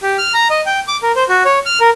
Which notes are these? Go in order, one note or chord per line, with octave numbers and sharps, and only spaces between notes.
G4
F6
A#5
D#5
G5
D6
A#4
C5
F#4
C#5
F6
A#4